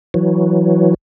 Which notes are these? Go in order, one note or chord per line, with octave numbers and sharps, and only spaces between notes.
E3 F#3